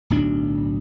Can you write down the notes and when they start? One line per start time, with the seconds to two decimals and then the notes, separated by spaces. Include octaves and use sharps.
0.10 D1 B1 D4